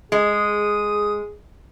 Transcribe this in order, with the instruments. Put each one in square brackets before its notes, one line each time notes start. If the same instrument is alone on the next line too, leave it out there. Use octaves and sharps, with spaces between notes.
[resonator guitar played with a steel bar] G#3 [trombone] G#4 [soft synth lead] D#6